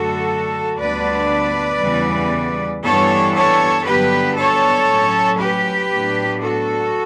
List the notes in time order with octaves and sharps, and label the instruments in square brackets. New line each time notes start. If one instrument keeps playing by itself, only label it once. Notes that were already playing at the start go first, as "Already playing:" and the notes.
Already playing: [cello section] F#2 D3 A3 F#4 A4
D2 D3 G3 B3 D4 B4 D5
E2 C#3 E3 G3 B3
G2 E3 G3 B3 D4 A4 C#5
A4 C#5
G2 D3 F#3 B3 D4 G4 B4
A4 C#5
A2 F#3 C#4
G4 B4
A2 F#3 B3 D4
F#4 A4